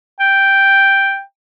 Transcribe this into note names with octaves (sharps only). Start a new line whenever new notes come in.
G5